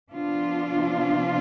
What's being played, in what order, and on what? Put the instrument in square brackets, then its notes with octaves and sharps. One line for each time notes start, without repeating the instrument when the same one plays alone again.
[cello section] C3 F3 B3 D4 F4